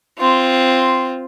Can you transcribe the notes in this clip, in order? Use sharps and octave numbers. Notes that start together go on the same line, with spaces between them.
C4 F4